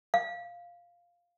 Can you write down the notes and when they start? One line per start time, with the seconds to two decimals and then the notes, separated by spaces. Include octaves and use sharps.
0.14 F5